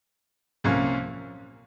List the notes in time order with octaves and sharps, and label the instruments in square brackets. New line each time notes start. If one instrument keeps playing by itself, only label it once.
[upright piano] C2 A#2 F3 A#3 C#4